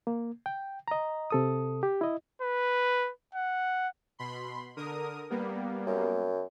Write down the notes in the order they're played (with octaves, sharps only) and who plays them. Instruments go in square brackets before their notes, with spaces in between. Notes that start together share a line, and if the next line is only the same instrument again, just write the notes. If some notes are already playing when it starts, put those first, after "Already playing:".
[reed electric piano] A#3
G5
D#5 A#5
C3 A4 D#6
G4
E4 D#5
[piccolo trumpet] B4
F#5
[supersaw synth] B2 B5 C6
D3 A#4 D#6
G3 A#3 B3
[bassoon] F#2